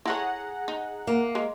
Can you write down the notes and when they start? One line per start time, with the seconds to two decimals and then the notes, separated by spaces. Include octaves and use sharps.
0.05 E4 G#4 A4 C#5 F#5 A#5
0.68 D#4
1.07 A#3
1.35 G#3